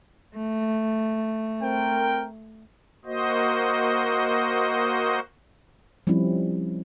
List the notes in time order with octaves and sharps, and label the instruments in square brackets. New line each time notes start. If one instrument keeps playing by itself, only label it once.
[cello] A3
[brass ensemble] C4 A#4 G5
[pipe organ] A#3 F#4 C5 D#5
[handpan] F3 G3 C4 C#4 E4